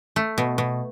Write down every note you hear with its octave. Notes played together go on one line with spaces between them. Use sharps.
A3
B2
B2